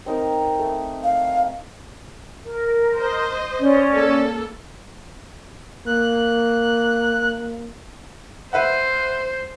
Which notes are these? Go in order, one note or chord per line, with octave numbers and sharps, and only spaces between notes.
C4 D#4 A#4
A3
F5
A#4
C5 D#5
C#4 D5
A#3 A4
A#3 F#6
B4 C5 E5 F#5